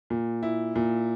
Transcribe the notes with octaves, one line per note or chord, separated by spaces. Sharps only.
A#2
E4
A#2